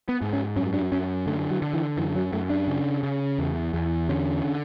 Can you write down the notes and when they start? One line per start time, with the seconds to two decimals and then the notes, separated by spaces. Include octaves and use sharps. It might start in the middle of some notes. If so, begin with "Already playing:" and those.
0.09 B3
0.21 G#2
0.33 C#4
0.56 F#2 C#4
0.73 D4
0.92 F#2 C#4
1.27 D3 A3
1.50 F#3
1.62 D3
1.73 E3
1.97 F#2 E3
2.15 F#3
2.33 F#2 A3
2.50 D4
2.67 C#3
3.03 C#3
3.38 E2
3.73 E2
4.09 D3 C#4
4.44 D3